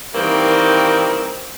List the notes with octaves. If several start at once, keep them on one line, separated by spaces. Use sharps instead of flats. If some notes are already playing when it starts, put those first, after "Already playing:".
D#3 E3 G3 A#3 C4 D#4